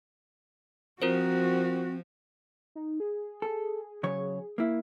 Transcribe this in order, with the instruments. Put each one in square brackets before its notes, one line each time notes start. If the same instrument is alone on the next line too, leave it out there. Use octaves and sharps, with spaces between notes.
[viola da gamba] F3 [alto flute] C4 [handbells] F4 A#4 C5 [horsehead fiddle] F#4
[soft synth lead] D#4
G#4
[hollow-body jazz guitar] A4
C#3 F#3 C#5
A#3 E4